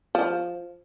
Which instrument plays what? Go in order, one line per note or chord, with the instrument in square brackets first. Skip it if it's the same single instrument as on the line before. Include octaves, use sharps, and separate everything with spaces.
[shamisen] F3